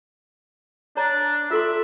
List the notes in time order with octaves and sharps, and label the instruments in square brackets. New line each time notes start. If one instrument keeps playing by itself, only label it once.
[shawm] D4 [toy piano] C#5 A#5
[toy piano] F4 A4 C6 [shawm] E5